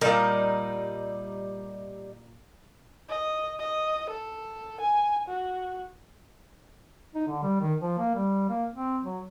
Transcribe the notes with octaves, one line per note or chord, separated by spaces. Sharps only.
A#2 G3 D#4 A#4
D#5
D#5
A4
G#5
F#4
D#4
D3
G3
D#3
F3
A#3
G3
A#3
C4
F#3